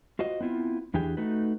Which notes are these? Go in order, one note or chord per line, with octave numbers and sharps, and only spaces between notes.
F4 F#4 C5 D#5
B3 C4 E4 F4
E2 E3 D4 G4 G#4 G5
A3 D#4 F#4 A4 B4